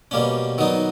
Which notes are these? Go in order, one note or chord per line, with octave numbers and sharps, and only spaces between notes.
B2 G3 A#3 C#4
D#3 F#3 B3 D#4